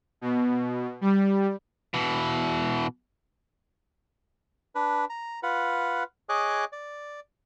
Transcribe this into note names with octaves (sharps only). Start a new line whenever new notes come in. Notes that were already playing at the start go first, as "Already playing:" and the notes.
B2
G3
B2 E3
D4 B4
A#5
F4 B4 F#5
G#4 C#5 D#5 D6 F#6
D5